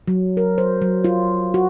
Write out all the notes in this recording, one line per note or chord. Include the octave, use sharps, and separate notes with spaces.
F#3
A#4
C5
F#3
F4
F#4